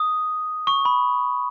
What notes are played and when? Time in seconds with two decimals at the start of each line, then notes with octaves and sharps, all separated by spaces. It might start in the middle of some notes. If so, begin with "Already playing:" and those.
Already playing: D#6
0.67 C#6
0.85 B5